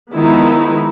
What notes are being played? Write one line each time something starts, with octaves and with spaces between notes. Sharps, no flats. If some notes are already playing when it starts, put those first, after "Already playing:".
D#3 F3 G#3 B3 D#4 E4